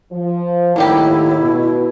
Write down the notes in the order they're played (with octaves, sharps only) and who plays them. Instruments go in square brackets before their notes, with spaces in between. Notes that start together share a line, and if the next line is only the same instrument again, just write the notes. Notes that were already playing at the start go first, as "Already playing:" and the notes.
[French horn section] F3
[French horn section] D#2 A2 D#3 [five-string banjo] F#3 G3 G4 [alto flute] E4
[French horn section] B2